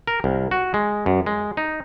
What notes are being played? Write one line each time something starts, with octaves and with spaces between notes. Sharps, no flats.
A#4
C2
F#4
G#3
F#2
G#3
D#4